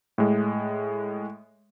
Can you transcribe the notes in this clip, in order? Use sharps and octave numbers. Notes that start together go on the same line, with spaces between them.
A2 G#3